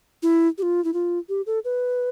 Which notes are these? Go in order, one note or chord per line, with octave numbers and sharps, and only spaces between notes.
E4
G4
F4
E4
F4
G4
A4
B4